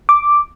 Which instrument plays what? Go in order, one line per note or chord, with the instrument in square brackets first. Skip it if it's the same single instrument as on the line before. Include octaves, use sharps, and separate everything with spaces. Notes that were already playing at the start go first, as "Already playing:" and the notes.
[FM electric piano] D6